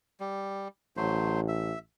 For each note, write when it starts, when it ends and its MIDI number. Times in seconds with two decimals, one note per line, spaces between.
0.20 0.68 55
0.97 1.73 33
0.97 1.40 54
0.97 1.40 57
0.97 1.40 72
1.48 1.79 76